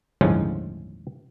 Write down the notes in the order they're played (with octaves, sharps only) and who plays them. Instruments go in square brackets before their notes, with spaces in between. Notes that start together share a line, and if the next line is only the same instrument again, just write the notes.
[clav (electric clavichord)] G1 D#2 A2 F3 G#3 C#4